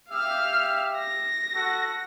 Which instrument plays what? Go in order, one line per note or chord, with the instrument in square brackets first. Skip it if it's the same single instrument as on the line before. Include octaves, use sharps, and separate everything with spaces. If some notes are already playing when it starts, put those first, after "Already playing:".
[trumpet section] G4 E5 [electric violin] F5 F6
[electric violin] A#6
[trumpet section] F#4 A4